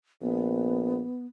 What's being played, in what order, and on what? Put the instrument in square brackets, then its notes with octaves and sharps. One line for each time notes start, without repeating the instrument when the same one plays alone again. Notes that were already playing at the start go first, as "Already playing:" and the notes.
[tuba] A#1 [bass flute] B3